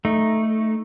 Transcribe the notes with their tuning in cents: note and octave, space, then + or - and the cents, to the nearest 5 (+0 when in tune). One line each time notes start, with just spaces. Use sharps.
A3 +0 D#4 +0